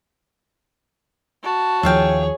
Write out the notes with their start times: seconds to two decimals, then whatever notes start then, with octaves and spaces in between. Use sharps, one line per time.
1.44 F#4 A5
1.83 D#2 F3 G#4 C#5 E5 F5 G5